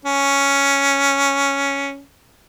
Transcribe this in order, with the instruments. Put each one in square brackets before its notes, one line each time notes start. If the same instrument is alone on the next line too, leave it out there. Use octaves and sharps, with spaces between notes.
[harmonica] C#4